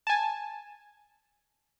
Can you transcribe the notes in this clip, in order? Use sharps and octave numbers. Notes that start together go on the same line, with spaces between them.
G#5 A5